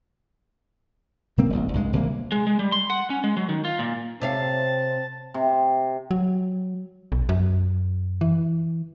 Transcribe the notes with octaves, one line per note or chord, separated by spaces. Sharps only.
C3 F#3 A#3 C4
E1 C2
C2 G2 G#3
C2 C3 E3 A#3
G#3
G#3
G3
C6
F#5
C#4
G#3
F#3
D#3
F4
A#2
C3 C4 C#5 F5 A5
C3
F#3
B1
F#2
E3